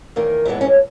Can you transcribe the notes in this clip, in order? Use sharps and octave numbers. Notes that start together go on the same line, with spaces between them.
E2 D#3 A#3
G2 E3 G#3 B3 E4
C#4